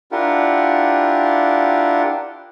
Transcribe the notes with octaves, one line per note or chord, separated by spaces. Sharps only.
D4 E4 F4 G4 A#4 F#5